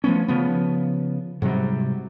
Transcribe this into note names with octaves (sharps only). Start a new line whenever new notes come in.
F3 A3 B3 C#4
C#3 F3 B3
G#2 C3 F#3 G3